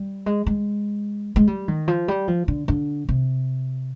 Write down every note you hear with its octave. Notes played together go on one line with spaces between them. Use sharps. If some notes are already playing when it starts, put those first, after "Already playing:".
Already playing: G3
G#3
G#3
G#3
G3
D#3
F3
G3
F3
D3
D3
C3